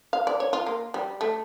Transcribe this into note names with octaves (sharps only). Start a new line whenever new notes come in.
F5
D5
C#5
F4
A#3
G3
A3